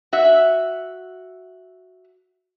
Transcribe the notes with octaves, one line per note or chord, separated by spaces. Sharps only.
F#4 E5